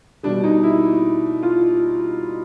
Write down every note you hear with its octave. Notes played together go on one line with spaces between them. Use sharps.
B2 G3 D4
D#4
E4
F4